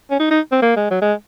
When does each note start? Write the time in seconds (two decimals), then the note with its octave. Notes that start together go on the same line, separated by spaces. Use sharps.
0.11 C#4
0.19 D#4
0.31 D#4
0.52 C4
0.62 A#3
0.76 G#3
0.91 F#3
1.02 G#3